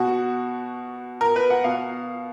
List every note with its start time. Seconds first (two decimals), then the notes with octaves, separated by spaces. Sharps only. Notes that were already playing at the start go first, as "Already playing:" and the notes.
Already playing: B2 F#4
1.21 A#4
1.36 B4
1.50 F#5
1.64 B2 F5